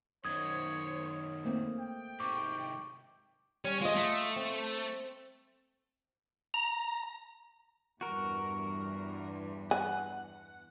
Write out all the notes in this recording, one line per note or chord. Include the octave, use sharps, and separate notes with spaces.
F#2 D#3 C5 C#5 D#6 G#6
A3 A#3 C4
G5
G#2 C3 C#6 D6
G3 C#4
G#3 F4 D#5
A3
C4
A#5
E2 G2 F#4 A#4
F#5 G#5